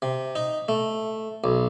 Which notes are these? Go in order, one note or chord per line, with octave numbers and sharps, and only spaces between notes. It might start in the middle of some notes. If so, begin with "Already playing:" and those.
C3
D#4
A3
B1